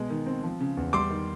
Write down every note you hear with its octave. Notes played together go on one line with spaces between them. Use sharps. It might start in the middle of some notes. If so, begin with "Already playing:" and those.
Already playing: B2 G#3
D#3
C4
F3
C#3
E2
G3 C6 D6
D#3